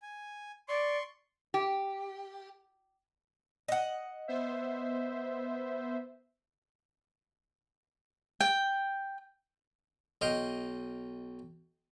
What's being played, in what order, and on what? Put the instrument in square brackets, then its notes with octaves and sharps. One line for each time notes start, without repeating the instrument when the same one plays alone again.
[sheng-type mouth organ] G#5
[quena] D5 [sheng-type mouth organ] C6 C#6
[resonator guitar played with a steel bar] G4
[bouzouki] D#5 F#5
[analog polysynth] B3 C5 E5
[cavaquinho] G5
[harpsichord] B1 D#5 F5 G5